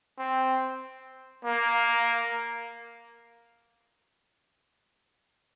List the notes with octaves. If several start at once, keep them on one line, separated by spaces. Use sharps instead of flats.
C4
A#3